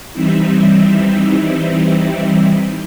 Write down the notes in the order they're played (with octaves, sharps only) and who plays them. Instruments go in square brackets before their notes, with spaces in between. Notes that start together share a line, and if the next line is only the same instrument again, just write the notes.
[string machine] E3 G3 C4 D#4 E4